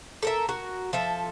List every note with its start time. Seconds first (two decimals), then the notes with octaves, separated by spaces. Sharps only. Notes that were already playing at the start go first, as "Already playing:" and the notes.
0.22 A4 A#4 E5
0.49 F#4 A#4
0.93 F3 A4 E5